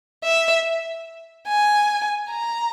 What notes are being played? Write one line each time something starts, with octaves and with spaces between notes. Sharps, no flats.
E5
G#5
A#5